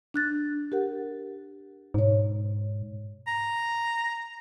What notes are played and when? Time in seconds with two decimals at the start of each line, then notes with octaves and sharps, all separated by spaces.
0.14 D4 F#6 A6
0.72 G4 A#4 F#5
1.94 G#2 B2 C#5
3.27 A#5